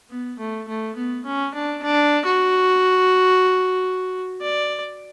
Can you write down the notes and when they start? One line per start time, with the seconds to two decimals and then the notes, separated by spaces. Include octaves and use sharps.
0.10 B3
0.39 A3
0.68 A3
0.96 B3
1.25 C#4
1.55 D4
1.83 D4
2.26 F#4
4.42 D5